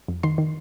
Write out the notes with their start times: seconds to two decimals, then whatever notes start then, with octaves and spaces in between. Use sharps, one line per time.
0.08 F2
0.23 D#3 C6
0.38 D#3